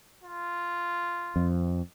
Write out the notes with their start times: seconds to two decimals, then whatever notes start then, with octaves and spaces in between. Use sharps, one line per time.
0.23 F4
1.36 F2